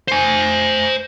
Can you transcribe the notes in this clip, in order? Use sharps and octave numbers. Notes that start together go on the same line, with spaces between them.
C5 G#5